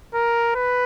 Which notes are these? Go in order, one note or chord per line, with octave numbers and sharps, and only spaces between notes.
A#4
B4